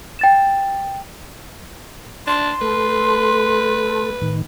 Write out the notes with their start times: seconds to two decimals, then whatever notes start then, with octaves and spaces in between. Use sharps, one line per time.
0.19 G5 A6 E7
2.27 D4 C6
2.61 A3 A4 B4
4.22 A2 D#3